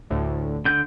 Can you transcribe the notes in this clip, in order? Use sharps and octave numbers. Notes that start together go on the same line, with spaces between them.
D2 A2 D3
D3 G6